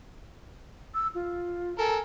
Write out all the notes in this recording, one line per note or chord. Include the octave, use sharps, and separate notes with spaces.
E6
F4
A4 A#4 G#5